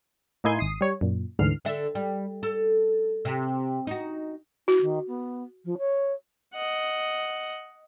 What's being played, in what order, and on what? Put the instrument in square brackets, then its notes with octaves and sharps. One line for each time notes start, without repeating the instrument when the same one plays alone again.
[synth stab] A2 A#3 D#4 E4 G#5 C6
G#1 D#6 C7
G3 C#5
F#2 A#2
D2 G#2 D3 E3 F6 C7
[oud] D3 A4 E5
G3
A4
C3
D#4 F#4
[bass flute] E4 [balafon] F#4
[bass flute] D#3
B3
F3
C#5
[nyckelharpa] D#5 F#5